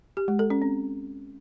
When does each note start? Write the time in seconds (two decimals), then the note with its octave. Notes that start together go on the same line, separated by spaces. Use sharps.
0.17 G4
0.28 G#3
0.39 A4
0.50 C#4
0.62 C4